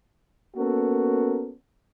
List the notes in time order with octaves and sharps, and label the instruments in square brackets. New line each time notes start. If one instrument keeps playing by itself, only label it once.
[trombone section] A#3 B3 C#4 F#4 A4 A#4